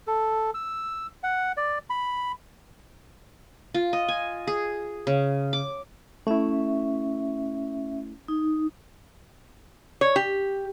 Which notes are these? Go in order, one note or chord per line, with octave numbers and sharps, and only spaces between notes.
A4
E6
F#5
D5
B5
F4
D#5
G#5
G#4
C#3
D6
A3 C#4 E4 E5
D#4
C#5
G4